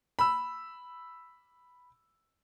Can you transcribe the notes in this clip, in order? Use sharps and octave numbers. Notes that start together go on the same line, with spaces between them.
B5 E6